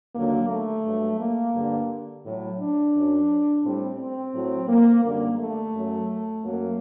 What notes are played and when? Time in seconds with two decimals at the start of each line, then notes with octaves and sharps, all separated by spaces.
0.14 D#2 D3 F#3 A#3
0.49 A3
0.84 G2 F#3
1.19 A#3
1.54 G2 D3 G3
2.25 A2 F#3
2.59 D4
2.94 F#2 F#3
3.64 A2 G3 C4
3.99 C4
4.34 A2 F#3
4.69 A#3
5.04 F#2 D3 G3 A#3
5.39 A3
5.74 F#2 F#3
6.43 F#2 F#3 A#3